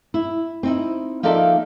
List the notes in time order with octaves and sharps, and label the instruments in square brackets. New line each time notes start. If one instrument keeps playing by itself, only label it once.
[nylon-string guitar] E4
C4 D#4 E4
F3 A#3 D#4 A4 D5 E5